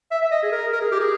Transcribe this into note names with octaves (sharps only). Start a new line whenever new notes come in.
E5
E5
D#5
G#4
A#4
A#4
G#4
G4
G#4